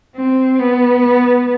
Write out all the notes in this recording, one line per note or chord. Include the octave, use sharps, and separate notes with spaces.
C4
B3